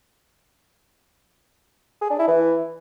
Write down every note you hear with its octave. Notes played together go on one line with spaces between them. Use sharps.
G#4
D4
E4
E3